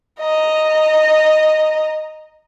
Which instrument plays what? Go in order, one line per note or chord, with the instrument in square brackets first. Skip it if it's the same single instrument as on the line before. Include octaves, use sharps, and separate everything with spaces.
[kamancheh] D#5 A#5